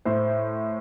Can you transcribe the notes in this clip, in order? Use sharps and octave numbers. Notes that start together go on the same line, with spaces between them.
A2 C5